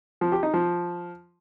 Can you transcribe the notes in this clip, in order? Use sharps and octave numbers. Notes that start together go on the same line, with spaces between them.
F3
G4
D#4
F3